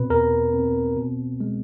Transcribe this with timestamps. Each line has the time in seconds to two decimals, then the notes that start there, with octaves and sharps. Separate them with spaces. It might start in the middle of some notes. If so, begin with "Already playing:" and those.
Already playing: B2 C4 B4
0.10 E2 A#4
0.54 C4
0.97 B2
1.41 G#3